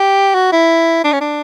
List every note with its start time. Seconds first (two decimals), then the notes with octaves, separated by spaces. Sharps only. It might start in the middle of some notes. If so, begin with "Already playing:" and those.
Already playing: G4
0.35 F#4
0.52 E4
1.04 D4
1.13 C#4
1.21 D4